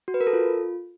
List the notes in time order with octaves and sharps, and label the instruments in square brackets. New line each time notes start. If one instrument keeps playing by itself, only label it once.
[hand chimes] F#4
B4
A#4
A4
F4